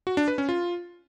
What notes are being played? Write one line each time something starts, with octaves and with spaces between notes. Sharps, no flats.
F#4
D4
B4
C#4
F4